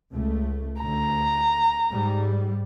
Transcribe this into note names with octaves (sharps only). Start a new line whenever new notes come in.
C#2 A3
D2 A#5
G#2 G3